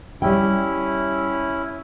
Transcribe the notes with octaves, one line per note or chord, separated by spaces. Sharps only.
G3 C#4 E4 G5